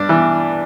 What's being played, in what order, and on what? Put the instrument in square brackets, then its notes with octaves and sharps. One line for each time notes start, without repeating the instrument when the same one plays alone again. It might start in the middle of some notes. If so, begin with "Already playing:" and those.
Already playing: [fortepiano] G2 D4
E3